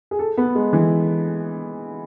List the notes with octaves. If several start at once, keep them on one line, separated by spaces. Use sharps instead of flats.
G#4
A4
B3
G#3
E3